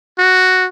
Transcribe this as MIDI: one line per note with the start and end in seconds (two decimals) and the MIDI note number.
0.19 0.67 66